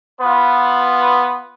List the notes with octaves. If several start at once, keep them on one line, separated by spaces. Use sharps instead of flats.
B3 F4 B4